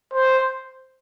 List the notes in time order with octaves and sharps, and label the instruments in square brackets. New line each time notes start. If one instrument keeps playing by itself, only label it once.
[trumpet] C5